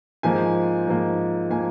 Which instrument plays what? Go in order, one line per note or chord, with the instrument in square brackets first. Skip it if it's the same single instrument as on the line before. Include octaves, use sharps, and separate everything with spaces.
[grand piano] G#2 F3 A#3 G#5
G#2 F3 A#3
F3 A#3 G#5